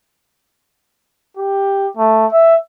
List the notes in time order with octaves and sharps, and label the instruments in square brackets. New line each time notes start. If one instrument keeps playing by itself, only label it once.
[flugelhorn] G4
A3
E5